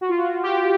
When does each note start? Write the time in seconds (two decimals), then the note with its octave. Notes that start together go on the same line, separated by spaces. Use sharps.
0.01 F#4
0.09 F4
0.17 F#4
0.43 G4